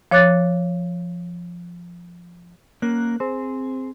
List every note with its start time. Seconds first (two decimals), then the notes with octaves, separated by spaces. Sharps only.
0.11 F3 C#5 D6 F#6 A6
2.82 A#3 C#4 A#4 F#6
3.20 C4 G#4